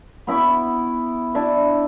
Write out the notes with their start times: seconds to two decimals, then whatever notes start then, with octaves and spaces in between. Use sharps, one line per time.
0.27 B3 E4 B5 C#6
1.34 D4 E4 D5 E5